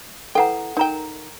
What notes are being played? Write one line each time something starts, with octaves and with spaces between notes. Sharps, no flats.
E3 A4 F#5 G5 A#5
D#4 A#4 G5 A#5